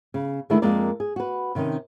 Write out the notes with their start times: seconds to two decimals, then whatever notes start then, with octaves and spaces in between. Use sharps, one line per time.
0.14 C#3
0.50 D3 D#3 G#3 A3 D4 E4
0.62 F2 G#3 A#3 A#4 D5
1.00 G#4
1.16 F#4 B4
1.55 C3 D#3 C#4 D#4